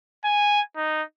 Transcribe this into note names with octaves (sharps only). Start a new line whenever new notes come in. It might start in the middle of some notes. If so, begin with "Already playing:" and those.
G#5
D#4